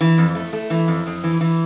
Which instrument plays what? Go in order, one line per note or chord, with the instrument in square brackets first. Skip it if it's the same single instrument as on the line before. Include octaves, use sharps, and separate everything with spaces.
[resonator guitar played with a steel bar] E3
F2
A3
A3
E3
F2
F2
E3
E3